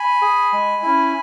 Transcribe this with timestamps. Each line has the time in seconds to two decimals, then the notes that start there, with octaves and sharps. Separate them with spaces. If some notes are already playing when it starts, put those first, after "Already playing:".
Already playing: G#5 B5
0.22 G#4
0.53 G#3
0.83 C#4 E4